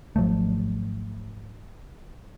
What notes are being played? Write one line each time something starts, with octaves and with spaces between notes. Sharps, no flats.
G#1 F3 F#3 A3